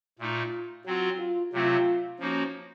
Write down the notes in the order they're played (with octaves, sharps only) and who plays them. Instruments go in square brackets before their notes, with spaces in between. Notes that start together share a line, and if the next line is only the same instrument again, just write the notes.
[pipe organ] A#2 A3 D#4 [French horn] F4
[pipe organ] F#3 C4 F4 [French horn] F#4
[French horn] F4
[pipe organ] C3 F#3 A3 C4 [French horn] F4
[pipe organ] F3 A#3 D#4 F#4 [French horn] C#4